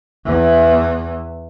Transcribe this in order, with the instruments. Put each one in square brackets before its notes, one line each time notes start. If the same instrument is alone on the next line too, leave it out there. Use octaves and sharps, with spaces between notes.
[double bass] E2 E3